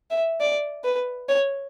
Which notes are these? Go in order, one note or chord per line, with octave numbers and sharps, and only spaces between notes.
E5
D5
B4
C#5